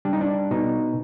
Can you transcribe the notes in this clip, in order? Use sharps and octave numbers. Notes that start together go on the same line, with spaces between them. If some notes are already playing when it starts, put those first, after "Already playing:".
G3 D4
D#4
D4
B2 D#4